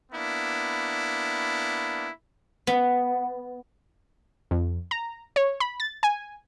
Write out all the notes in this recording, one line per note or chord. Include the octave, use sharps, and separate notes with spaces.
A#3 B3 D4 E4
B3
F2
A#5
C#5
B5
A6
G#5